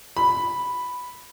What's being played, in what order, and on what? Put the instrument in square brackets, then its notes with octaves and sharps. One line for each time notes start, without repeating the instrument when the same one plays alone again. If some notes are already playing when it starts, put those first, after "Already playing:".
[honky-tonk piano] B5